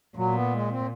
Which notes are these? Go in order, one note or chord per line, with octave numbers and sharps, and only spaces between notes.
A#2 F#3
B3
G#3
C4